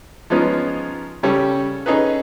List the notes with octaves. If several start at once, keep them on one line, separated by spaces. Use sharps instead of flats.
F3 G#3 B3 C#4 D#4 F4
C#3 G3 C#4 A4
C#4 D#4 G#4 A4 B4